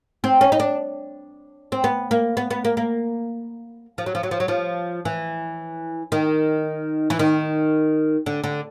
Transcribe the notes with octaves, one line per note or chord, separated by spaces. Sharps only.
C4
C#4
D#4
D4
C4
B3
A#3
B3
B3
A#3
A#3
F3
F#3
F3
F#3
F3
F#3
F3
E3
D#3
E3
D#3
D3
D3